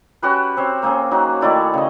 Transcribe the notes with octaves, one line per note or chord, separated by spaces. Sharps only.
C#4 F#4 G4 B4
C4 C5 C#5
A#3 C4 C#4 G#4
F#3 D#4 F#4
D#3 A3 E4 D5
C#3 D#5